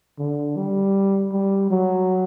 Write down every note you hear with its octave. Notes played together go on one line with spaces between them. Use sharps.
D3
G3
G3
F#3